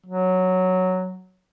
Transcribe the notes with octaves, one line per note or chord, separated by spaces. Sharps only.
F#3